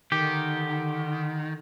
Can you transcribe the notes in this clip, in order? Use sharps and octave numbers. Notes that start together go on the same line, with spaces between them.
D3 D#3 G4